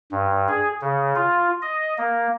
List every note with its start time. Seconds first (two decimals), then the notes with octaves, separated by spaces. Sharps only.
0.11 G2
0.48 G#4
0.81 C#3
1.15 F4
1.62 D#5
1.98 A#3